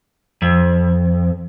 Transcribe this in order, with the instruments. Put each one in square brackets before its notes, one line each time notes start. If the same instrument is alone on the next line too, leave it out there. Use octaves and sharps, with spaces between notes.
[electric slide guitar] F2